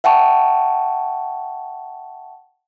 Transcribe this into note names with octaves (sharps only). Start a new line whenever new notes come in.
E5 F#5 G5 A5 C#6